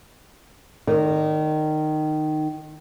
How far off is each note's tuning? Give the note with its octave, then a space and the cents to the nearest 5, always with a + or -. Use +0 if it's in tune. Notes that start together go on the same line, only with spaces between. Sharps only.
D#3 -15 D5 -40